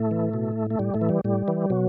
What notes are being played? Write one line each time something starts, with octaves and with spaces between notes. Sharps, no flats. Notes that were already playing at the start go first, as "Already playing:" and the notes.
Already playing: A2 A3
E3
B2
A3
A2 G3
A2 A3
E3
G3
A2 G3
E3
B2 F#3